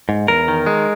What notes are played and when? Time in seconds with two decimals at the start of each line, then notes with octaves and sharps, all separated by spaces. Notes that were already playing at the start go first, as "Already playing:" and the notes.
0.09 G#2
0.28 E2 A#4
0.48 D#3
0.66 G#3